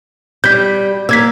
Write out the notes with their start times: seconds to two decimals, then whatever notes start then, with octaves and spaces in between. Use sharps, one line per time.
0.44 G3 G6 B6
1.09 A#3 E6 G#6 B6